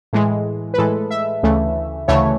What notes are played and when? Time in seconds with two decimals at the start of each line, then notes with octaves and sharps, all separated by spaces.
0.13 A2 E3 G#3
0.74 B4
0.78 A2 E3 G#3 A4
1.11 E5
1.43 D2 C#3 E3 A3
2.08 D2 C#3 E3 A3 C#5